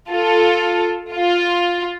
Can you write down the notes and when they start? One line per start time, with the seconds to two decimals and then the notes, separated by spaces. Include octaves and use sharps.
0.10 F4 A4
1.12 F4